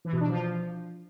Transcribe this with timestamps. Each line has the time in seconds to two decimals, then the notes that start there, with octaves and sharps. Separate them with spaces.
0.05 E3
0.13 B2
0.21 D4
0.29 F3